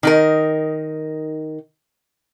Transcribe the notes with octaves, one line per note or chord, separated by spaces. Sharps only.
D#3 D#4 A#4